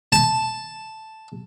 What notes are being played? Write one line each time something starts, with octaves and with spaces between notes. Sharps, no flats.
A5